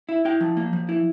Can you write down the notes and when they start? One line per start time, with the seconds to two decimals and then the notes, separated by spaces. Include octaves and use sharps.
0.09 E4
0.25 E4 G5
0.40 F3
0.57 A#3
0.73 F3
0.89 E4